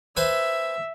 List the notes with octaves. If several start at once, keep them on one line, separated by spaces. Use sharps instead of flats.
B4 C5 E5 G#5